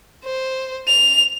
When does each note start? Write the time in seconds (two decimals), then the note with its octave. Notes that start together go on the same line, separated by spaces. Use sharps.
0.25 C5
0.88 F7